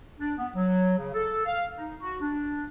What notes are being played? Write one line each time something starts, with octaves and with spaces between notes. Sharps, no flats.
D4
B3
F#3
C#3
A4
F5
D#4
F#4
D4